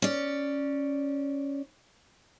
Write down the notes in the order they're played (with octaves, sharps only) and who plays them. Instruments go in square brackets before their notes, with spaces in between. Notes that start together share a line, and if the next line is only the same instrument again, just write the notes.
[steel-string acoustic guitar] C#4 D5